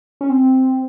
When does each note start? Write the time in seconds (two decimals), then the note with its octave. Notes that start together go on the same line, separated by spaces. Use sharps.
0.21 C#4
0.30 C4